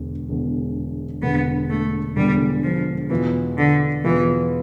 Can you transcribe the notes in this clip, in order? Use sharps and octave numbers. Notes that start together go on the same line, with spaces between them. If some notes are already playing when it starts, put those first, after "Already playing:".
Already playing: E1 E2 D3
E1 E2 D3
E1 E2 D3 B3
A3
E1 E2 D3 G3
F3
E2 B2 E3 B3 F4
D3
E2 B2 E3 B3 F4